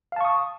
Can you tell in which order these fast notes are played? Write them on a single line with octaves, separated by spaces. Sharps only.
F5 A5 C#6 D#6